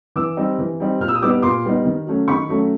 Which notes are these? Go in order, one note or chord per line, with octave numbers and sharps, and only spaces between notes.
E3 D6 E6
G3 C4 D#4
E3
G3 C4 D#4
A#2 F6
E6
D#6
G3 B3 D#4 D6 E6
A#2 C6 D6
G3 B3 D#4
D#3
F#3 A3 C#4
D#3 B5 C#6
F#3 A3 C#4